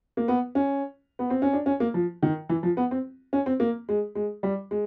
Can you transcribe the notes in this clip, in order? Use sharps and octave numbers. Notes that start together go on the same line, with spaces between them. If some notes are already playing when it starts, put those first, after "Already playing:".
A#3
B3
C#4
B3
C4
C#4
D4
C#4
A#3
F3
D#3
E3
F3
B3
C4
C#4
C4
A#3
G#3
G#3
G3
G#3